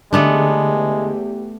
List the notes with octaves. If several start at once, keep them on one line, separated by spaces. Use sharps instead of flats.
E2 D3 G#3 A3 B3 D4 G4